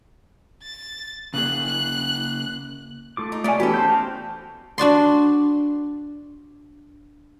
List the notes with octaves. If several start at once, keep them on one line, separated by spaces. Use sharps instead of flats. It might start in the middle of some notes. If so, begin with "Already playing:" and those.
A6
C#3 A#3 G#4 F#6
F#6
A3 F4 D6
D#4
C3 G3 A3 C#5 D5 G#5
E3 B3 C#4 F#4 G4 A4 G#5
C5 G5
F#4 F5
D4 F#4 D5 C6